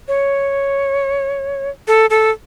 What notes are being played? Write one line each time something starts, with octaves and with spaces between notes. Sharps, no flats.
C#5
A4
A4